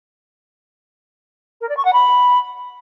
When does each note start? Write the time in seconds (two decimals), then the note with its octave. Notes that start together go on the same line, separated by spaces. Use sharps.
1.61 A#4
1.69 D5
1.77 C#6
1.85 F#5
1.93 B5